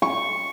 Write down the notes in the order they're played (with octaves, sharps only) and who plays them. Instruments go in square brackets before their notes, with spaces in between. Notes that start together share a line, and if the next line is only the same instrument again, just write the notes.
[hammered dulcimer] C#6